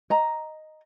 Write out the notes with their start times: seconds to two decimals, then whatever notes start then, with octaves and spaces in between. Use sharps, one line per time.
0.10 D#5 A#5